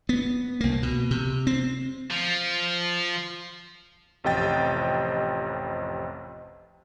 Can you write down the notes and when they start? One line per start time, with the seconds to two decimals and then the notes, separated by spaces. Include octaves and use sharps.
0.09 B3
0.61 C2 A#3
0.83 B2
1.11 C3
1.47 C4
2.10 F3
4.24 A1 F2 C3 D#5 G5 A6